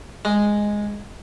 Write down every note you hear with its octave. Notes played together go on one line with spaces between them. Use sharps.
G#3